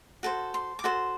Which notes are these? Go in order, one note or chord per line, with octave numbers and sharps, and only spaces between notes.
F#4 A4 C5
C6
D6
F#4 A4 C5 C6